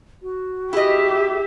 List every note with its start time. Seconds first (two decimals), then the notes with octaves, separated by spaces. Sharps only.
0.23 F#4
0.73 E4 G4 G#4 D#5 E5